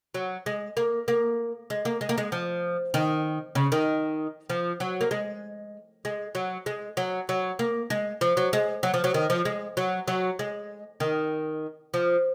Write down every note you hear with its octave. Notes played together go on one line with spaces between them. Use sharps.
F#3
G#3
A#3
A#3
G#3
A#3
G#3
A#3
G#3
F3
D#3
C#3
D#3
F3
F#3
A#3
G#3
G#3
F#3
G#3
F#3
F#3
A#3
G#3
F3
F#3
G#3
F#3
F3
F#3
D#3
F3
G#3
F#3
F#3
G#3
D#3
F3